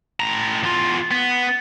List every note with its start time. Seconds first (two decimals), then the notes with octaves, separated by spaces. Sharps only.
0.20 A2 A#5
0.63 E2 F4
1.11 B3